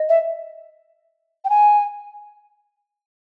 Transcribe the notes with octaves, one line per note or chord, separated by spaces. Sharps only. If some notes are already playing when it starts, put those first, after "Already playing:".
Already playing: D#5
E5
G5
G#5